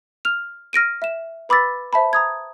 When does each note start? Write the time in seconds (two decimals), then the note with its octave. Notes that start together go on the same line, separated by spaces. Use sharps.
0.25 F6 F7
0.73 F6 A#6 D7 D#7
1.02 E5 E7
1.49 B4 B5 D6 E6 A6 B6
1.93 C5 E5 A5 B5
2.13 A#5 D#6 G#6